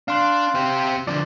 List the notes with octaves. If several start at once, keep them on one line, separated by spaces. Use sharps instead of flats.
D4 F5 C6 F#6
C4 G4
D3 F3 D5